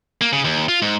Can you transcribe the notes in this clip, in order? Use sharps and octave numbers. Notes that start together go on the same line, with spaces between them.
A#3
C#3
D#2
F4
G#2